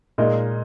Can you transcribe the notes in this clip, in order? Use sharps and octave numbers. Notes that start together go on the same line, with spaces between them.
A#2 G#3 D#4 A#4 D#5